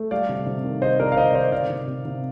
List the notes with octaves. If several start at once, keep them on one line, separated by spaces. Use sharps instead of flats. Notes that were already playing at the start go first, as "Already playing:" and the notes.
Already playing: A3
G3 D5 F5
C3
C3
D#3
C3 C5 D#5
C3 A#4 D5
F5
C3 C5 D#5
D5
D#3 C5 D#5
C3 D5 F5
C3
C3
C3